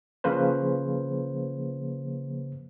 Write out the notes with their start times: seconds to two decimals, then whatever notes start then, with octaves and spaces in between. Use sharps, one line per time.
0.24 C#3 F3 A#3 B4 C5